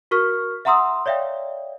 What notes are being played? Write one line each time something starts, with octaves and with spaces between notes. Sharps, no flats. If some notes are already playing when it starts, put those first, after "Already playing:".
F#4 A#4 C#6 F6 B6
E5 F#5 A#5 C6 D#6 E6
C#5 D5 E5 F5 G5